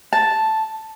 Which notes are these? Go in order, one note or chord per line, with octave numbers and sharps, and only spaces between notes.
A5